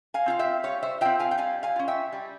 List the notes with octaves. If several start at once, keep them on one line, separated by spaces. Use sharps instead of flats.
F5 G#5
C4 F4 F5
E5 G5
G3 C#5 F5
C5 E5
C4 F4 E5 G5
F5 G#5
G5
G3 F5 G#5
F5 G#5
C#4 F4
E5 G5
G3